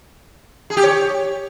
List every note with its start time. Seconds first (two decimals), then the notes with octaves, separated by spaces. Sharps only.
0.70 G#4
0.77 G4
0.83 C#5